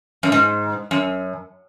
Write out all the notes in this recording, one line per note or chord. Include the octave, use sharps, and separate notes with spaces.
F#2
G#2
F#2